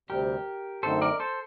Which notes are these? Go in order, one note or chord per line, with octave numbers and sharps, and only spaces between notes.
D2 C3 G3 C4 G4 A#4
F#2 D3 A3 C4 D#4 A4 C5
A#4 D5
A4 C5